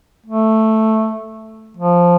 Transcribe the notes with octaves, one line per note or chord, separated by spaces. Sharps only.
A3
F3